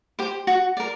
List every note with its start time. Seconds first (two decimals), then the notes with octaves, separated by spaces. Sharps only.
0.19 G4 C5
0.47 F#4
0.77 A#4 D5